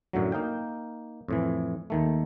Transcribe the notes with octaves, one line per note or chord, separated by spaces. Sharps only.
F#2 A2 D3 F#3
A#3 D#4 F5 G5
F2 A2 E3
D#2 D#3 A3